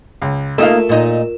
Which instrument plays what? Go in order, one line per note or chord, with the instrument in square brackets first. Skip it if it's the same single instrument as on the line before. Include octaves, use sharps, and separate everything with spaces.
[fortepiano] C#2
[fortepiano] A3 [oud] A#3 D#4 F5 [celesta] F4 A#4 E7
[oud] A#2 D#4